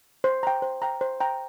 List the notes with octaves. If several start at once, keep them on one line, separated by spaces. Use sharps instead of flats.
C5
G5 A#5
C5
G5 A#5
C5
G5 A#5